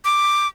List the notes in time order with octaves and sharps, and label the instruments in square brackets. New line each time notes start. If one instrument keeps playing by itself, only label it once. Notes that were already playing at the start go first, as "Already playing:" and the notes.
[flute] D6